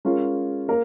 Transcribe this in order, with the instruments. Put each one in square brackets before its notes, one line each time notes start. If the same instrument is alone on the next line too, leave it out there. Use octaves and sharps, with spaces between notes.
[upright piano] G#3 C#4 F4 A#4
A#3 A#4